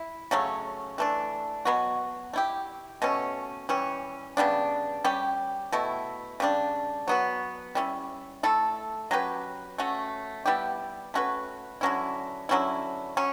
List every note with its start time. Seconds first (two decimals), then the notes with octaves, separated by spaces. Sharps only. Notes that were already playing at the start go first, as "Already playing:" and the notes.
Already playing: E4
0.31 C#3 F#3 A3 C#4
0.98 E3 A3 D4
1.65 B2 F#3 B3 F#4
2.33 A3 E4 G4
3.02 B2 A3 C#4
3.69 E3 G3 C#4
4.37 C#3 G3 B3 D4
5.04 G3 C#4 G4
5.72 B2 A3 E4
6.40 C#3 G3 D4
7.08 F#3 B3 F#4
7.75 G3 C#4 E4
8.43 A3 E4 A4
9.11 F#3 C#4 G4 B4
9.78 A3 C#4 F#4
10.46 G3 B3 E4 G4
11.14 A3 C#4 F#4 B4
11.81 D3 F#3 C#4 E4
12.49 D3 F#3 C#4 E4
13.17 F#3 C#4